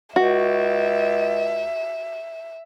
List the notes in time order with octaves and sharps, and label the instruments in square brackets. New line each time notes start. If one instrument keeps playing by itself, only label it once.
[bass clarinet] C#2 [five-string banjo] F#4 [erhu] E5